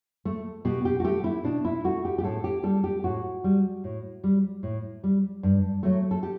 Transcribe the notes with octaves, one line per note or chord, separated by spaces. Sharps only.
A3
B2 G4
G4
F#4
A3 G4
E4
B2 D4
E4
A3 F#4
G4
G4
A2 A4
G4
G3 A4
G4
A2 F#4
G3
A2
G3
A2
G3
G2
F#3 A3
A4
G4